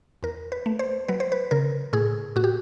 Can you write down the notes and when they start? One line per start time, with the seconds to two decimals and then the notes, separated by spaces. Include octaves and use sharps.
0.23 E2 A#4
0.52 B4
0.66 A3
0.79 C5
1.08 F#3 B4
1.20 C5
1.32 B4
1.51 C#3 A#4
1.93 A2 G#4
2.36 A2 F#4
2.44 G4